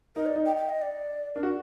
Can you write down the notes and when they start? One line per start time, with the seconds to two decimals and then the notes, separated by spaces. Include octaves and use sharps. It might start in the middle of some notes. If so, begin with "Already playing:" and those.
0.16 D#4 A#4
0.26 D5
0.35 D#4
0.46 G5
0.56 G5
0.69 D#5
0.82 D5
1.35 D4 A#4
1.43 F#4